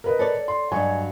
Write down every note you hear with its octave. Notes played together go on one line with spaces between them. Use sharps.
A#4 B4 D#5
A4 C#5 D5
C6
G2 F#3 D#5 G#5 C#6